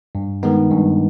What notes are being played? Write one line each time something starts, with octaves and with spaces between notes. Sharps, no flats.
G2
D#3 G#3 B3 D#4
G2